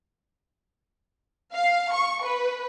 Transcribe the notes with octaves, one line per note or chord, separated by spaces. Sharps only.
F5
C#6
B4